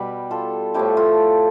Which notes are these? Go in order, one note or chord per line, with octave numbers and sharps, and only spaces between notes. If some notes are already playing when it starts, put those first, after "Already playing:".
Already playing: B2 G3 G4 B4
F4 A4
A2 F3 A3 E4 G4
F4 A4